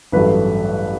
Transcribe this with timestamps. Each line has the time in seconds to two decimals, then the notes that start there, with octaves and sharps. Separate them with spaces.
0.12 A1 G2 F#3 A3 B4